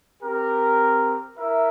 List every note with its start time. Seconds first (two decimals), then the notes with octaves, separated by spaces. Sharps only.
0.22 C4 G4 A#4
1.38 E4 A#4 E5